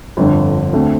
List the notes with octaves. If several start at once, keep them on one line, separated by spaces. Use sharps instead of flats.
G1 F2 D3
D2 D3 A3 C4